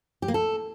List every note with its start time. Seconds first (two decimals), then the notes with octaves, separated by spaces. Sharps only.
0.22 G4
0.28 A#3
0.34 A4